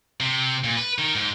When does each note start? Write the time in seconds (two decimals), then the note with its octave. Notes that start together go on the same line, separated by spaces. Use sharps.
0.20 C3
0.64 A#2
0.77 B4
0.99 D#3
1.15 G#2